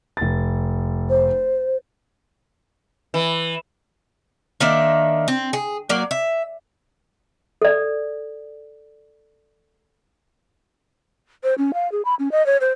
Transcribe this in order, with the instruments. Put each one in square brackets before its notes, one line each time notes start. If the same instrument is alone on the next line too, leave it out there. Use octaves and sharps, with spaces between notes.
[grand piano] F1 A6
[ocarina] C5
[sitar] E3
[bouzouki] D#3 A#3 D4 E5
C4
G#4
F#3 A#3 D5
E5
[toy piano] A4 D5
[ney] C5
C#4
F5
G#4
B5
C#4
D#5
C#5
C5